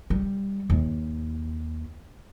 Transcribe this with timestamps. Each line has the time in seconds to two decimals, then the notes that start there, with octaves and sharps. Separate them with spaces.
0.10 G3
0.70 D#2